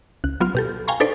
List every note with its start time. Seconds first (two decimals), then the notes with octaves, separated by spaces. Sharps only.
0.24 C#2 F#6
0.40 F#3 B3 F4 C6 F6
0.55 B2 G4 A4
0.88 F5 G5 G#5 A#5 C6 C#6
1.00 D4 D#4 A4 B4 C5 D5